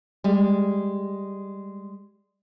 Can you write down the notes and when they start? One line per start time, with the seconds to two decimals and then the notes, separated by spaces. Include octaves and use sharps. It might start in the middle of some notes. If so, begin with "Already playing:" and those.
0.24 G3 G#3